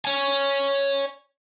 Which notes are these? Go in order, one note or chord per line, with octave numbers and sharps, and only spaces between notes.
C#5 G#5